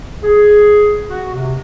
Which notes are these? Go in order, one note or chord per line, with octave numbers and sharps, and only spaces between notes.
G#4
F#4
C3